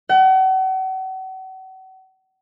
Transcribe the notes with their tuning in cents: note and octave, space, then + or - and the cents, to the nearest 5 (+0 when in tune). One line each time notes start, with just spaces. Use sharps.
F#5 +40